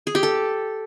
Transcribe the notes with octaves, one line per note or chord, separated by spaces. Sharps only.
G#4
G4
A4